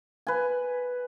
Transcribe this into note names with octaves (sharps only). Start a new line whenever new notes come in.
B4 G#5